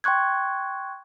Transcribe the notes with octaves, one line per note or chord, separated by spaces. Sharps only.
G5 C6 C#6 F#6 G#6